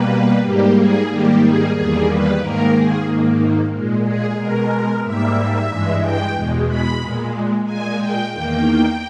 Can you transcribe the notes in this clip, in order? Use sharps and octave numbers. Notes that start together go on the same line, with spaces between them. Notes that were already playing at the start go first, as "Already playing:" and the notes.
Already playing: B2 G3 A#3 B4
G#2 G3 A#3 G4
G#4
G#2 D#3 G3 A#3 G4
G#4
E2 D#3 G3 A#3 G#4
B4
G#2 D#3 A#3 A#4
G#4
G#2 D#3 A#3
A#2 G#3
G#4
B2 G#3 A#4
G#2 G3 A#3 E5
G2 E3 G#3
G5
E2 B2 G#3
B5
A#2 G#3
A#2 G#3 G#5
G5
E2 D#3 A#3 G5